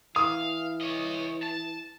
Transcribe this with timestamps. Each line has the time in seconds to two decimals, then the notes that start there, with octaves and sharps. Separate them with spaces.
0.16 E3 F5 D#6
0.81 C#5 D#5
1.43 A5